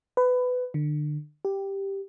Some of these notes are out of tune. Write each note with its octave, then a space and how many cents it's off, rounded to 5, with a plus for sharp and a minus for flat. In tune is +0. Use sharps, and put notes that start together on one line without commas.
B4 +20
D3 +30
G4 +0